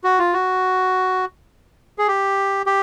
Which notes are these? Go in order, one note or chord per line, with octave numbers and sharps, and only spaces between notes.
F#4
F4
F#4
G#4
G4
G4